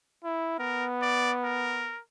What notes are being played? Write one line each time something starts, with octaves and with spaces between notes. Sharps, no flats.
E4
B3 A#4
D5
A#4